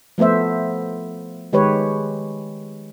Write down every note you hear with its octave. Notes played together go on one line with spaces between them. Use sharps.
F3 A3 B3 C5 E5
D#3 G#3 G4 B4 C#5